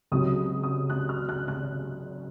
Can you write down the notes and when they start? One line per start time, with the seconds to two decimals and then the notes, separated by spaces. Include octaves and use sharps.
0.12 C#2 C3 F#3 D#6
0.63 D#6
0.90 F#6
1.09 F6
1.29 F#6
1.48 F#6